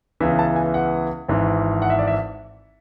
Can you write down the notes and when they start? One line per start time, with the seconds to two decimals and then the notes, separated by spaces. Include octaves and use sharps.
0.20 C#2 C#3 E3 B3 E5
0.39 A5
0.56 G#5
0.74 F#5
1.29 G#1 G#2 E3
1.82 F#5
1.90 E5
1.99 D5
2.07 E5